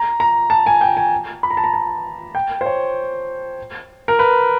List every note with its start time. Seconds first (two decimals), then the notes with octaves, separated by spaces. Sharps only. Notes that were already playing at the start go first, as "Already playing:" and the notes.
Already playing: A#5
0.20 A#5
0.50 A5
0.66 G#5
0.81 G5
0.97 G#5
1.43 B5
1.51 A#5
1.57 A5
1.64 A#5
1.74 A5
2.35 G5
2.61 C5
2.66 C#5
4.08 A#4
4.19 B4